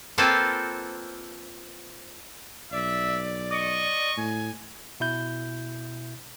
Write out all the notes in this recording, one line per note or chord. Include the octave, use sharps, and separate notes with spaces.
A#3 C4 F4 A4 B4 C5
B1 D5 E5
D#5 C#6
A2 G#5
B2 E4 G6